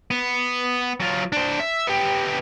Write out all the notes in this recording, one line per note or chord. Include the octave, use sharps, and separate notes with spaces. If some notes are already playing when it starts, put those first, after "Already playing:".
B3
F#3 F4
D4 C5
E5
B3 G4